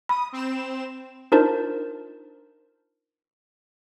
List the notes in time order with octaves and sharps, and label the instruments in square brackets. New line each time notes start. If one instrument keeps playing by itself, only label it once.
[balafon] B5 [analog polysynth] D#6
[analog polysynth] C4 E7
[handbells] D4 D#4 F4 A#4 C5 A5